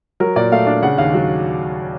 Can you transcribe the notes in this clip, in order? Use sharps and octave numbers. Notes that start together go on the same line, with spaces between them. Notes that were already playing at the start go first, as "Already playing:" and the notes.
F#3 A#4
A#2 D5
A3 F5
D4
C#3 F#5
D#2 F5
F#3